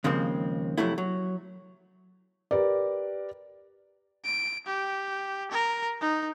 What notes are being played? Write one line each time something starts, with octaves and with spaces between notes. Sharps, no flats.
D#2 C#3 F3 G#3 A#3 C4
F2 C3 F#3 A3 E4
F#3
G4 A#4 B4 D5
D7
G4
A#4
D#4